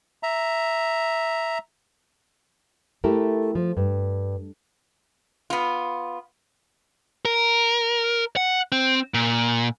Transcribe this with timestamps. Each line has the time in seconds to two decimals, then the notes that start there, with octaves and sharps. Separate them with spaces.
0.23 E5 A#5
3.04 A3 E4 G4 A4 A#4
3.55 F3
3.77 G2
5.50 B3 F4
7.25 A#4
8.37 F#5
8.72 C4
9.14 A#2